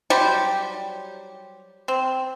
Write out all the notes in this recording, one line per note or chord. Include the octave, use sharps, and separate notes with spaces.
F#3 G3 G4 C5
C4